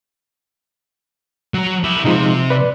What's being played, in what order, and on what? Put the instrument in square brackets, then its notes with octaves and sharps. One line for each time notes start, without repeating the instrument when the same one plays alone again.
[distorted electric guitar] F#3 A#5
E4 G4
[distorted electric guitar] C3 C5 [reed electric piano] F3 G#3 D#4
[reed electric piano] B4 D5